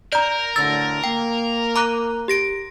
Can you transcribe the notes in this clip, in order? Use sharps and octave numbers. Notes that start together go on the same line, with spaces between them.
A#4 D5 A#5 G6
D2 A2 D3 E6 A6
A#3 G5
A#5 D6 F#6
G4 A#6 D7